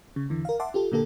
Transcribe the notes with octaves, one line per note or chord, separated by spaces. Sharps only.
C#3
E2 D3 E3
A#4 F5
E5 F#5 A5 C6 D6
F4 G4 A4
A#2 D3 A#3 G4 A4